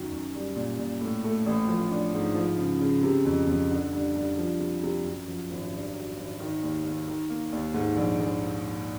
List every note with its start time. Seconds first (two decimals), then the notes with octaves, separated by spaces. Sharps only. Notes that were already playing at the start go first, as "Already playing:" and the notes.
Already playing: F#2 D#3
0.11 F#2
0.34 G3
0.56 A#2
0.78 A#2
1.01 A2
1.24 A3
1.46 A1
1.68 F3
1.91 D4
2.14 G#2
2.35 F3
2.58 C#3
2.81 C#3
3.03 C3
3.25 F2
3.47 F2
3.70 D3
3.93 G2
4.16 G2
4.38 F3
4.59 C3
4.83 C3
5.04 F#2
5.28 F3
5.50 G#1
5.73 G2
5.94 F#3
6.17 G#1
6.40 D#3
6.63 D#2
6.84 D#2
7.07 D#3
7.30 A#3
7.52 D#2
7.74 G#2
7.96 A#1
8.20 A#1